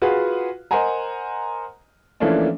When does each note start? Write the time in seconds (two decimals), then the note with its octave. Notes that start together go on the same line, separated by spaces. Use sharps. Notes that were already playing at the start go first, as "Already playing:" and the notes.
0.02 F4 F#4 G#4 B4 F5 F#5
0.71 A#4 C5 D#5 F#5 G#5 A#5
2.20 E3 F3 A3 A#3 C#4 D4